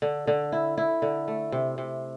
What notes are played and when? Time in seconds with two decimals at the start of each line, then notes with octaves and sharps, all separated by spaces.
0.02 D3
0.27 D3
0.52 E4
0.78 E4
1.02 D3
1.28 A3
1.52 C3
1.78 C3